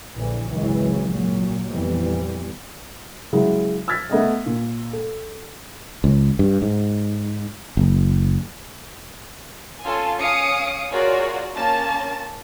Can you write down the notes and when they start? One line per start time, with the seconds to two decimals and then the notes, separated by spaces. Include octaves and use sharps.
0.16 A#1 D3 E3
0.49 G#1 C#2 E3 F#3
1.11 A#2 F#3
1.69 F2 A#2 E3 G3 B3
3.33 C#3 F#3 G#3 E4
3.88 E6 F6 G#6 A6 B6
4.10 A3 B3 D#5 E5
4.46 A#2
4.93 A4
6.04 C#2
6.39 G2
6.62 G#2
7.77 F#1
9.83 C#4 F4 A4 G#5
10.18 C#4 F5 D#6 C#7 D7
10.91 F4 F#4 G#4 A#4 C#5 D5
11.54 A#3 C#4 A5 A6